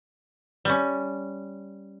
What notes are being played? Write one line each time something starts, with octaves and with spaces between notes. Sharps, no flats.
G3 C#4